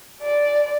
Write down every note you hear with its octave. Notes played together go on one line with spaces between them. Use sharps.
D5